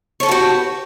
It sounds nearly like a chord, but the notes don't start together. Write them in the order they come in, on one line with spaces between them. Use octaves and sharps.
C#5 A4 B4 F#4 G4